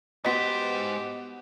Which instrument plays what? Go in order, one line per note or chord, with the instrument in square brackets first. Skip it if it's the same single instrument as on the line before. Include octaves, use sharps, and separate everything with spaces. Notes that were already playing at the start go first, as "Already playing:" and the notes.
[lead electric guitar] G#2 C5 [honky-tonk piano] B3 F#4 B4 [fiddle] G4 [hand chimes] D#5 B6